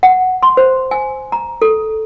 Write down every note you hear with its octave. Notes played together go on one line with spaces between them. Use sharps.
F#5
C6
C5
G#5
A#5
A4